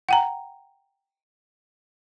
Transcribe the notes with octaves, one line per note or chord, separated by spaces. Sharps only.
F#5 G5 A#5